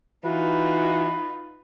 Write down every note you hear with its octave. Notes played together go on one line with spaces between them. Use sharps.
E3 D#4 F4 F#4 B4